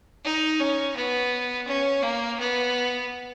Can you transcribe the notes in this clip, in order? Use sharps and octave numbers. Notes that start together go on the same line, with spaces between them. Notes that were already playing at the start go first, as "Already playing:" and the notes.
D#4
C#4
B3
C#4
A#3
B3